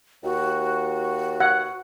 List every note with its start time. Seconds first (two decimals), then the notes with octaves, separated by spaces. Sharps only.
0.24 D#2 F#4
1.40 F#5